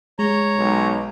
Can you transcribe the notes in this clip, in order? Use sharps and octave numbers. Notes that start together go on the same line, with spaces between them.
G#3 C#5 A#5
B1